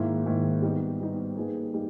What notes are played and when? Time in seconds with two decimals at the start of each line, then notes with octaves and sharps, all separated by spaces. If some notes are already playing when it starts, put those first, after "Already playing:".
Already playing: G#2 D#3 A#3 E4
0.26 G#2 D#3 A#3 E4
0.62 G3 B3 D#4
1.00 G3 B3 D#4
1.36 G3 A#3 D#4 G#4 B4
1.74 G3 A#3 D#4